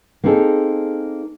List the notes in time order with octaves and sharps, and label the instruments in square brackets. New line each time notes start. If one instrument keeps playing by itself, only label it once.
[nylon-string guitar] A#3 C4 D#4 G#4 A4